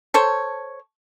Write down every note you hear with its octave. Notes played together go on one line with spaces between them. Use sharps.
A4 C5 C#5